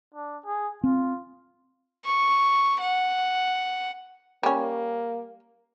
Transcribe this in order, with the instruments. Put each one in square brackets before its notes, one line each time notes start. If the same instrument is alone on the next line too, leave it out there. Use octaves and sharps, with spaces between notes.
[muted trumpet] D4
G#4
[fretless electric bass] C4 [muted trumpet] F4
[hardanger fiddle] C#6
F#5
[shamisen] G3 C#4 [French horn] A#3